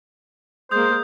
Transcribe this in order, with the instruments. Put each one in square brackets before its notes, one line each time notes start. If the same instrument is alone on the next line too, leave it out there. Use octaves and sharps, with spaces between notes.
[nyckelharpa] G#3 A#3 [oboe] C5 [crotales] D#6 G6